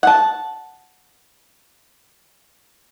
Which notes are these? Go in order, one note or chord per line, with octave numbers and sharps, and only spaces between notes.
F#5 A5